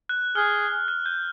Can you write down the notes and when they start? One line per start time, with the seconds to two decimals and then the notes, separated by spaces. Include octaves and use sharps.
0.09 F#6
0.35 G#4 F6
0.88 F#6
1.06 G6